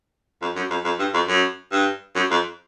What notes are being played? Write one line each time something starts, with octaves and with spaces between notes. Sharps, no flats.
F2
F#2
F2
F2
G2
F2
F#2
G2
F#2
F2